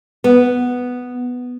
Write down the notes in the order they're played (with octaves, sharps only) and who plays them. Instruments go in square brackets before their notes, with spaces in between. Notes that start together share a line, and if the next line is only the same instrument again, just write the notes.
[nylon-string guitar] B3